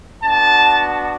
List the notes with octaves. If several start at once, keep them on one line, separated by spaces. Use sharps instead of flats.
B3 D4 F#4 A5